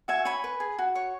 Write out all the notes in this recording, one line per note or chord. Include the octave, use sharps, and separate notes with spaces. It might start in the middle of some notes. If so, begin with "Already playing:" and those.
F#4 E5 G#5
C#5 G#5 B5
B4
G#4
F#4
C#5